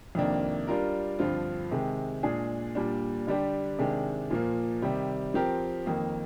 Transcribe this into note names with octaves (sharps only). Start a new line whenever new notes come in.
F2 C3 D#3 A#3 D4
G3 D4 F4 A#4
G2 D3 F3 C4 F4
C3 D#3 G#3
A#2 G#3 D4 G#4
A#2 G3 D4
D3 G3 D4 G4
C3 D#3 G#3 D4
A#2 F3 A#3
C3 D#3 G3
F3 C4 G4 A#4
F2 D#3 A#3